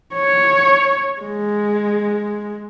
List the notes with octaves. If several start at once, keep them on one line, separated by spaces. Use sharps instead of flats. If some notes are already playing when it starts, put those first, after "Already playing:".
C#5
G#3